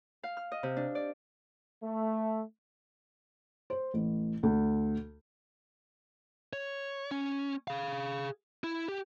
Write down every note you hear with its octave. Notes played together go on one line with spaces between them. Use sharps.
F5
F6
D#5
C3
D4
D5
A3
C5
A1
D2
C#5
C#4
G#4 F5
E4
G4